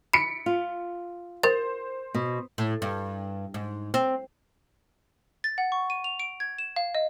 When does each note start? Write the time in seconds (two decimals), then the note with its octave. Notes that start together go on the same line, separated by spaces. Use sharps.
0.13 B5 B6 C#7 D7
0.46 F4
1.43 A#4 C5 A6
2.14 B2
2.58 A2
2.82 G2
3.54 G#2
3.94 C4
5.44 A6
5.58 F#5
5.72 C#6
5.90 D#7
6.04 F7
6.20 D7
6.40 G#6
6.58 E7
6.76 F5
6.95 D#5